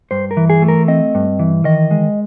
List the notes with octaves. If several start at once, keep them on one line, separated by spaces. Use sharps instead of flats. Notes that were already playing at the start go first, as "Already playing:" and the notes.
G2 C5
A#4
E3
G#4
A3
A#4
C4 D#5
G2
E3
D#3 D#5
G#3